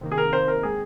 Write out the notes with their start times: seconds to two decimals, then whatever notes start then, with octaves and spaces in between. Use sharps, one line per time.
0.01 C3 D#3 A#3
0.12 G#4
0.18 A#4
0.33 C5
0.48 A#4
0.63 D#3 G#3 C4 G#4